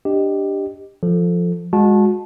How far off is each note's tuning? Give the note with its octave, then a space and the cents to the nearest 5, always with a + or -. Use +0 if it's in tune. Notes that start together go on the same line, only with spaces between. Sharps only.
D4 +0 G4 +0 D#5 -10
F3 +0 A4 +0
G#3 -10 F#4 -30 A5 -15